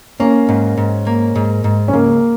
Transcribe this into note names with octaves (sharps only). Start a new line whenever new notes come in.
A#3 C#4
G#2
G#2
A#3
G#2
G#2
C#4
C#2 A#3